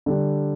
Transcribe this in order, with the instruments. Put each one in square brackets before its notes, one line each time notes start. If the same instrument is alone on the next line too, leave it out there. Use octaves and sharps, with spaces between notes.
[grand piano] D3 G3 D4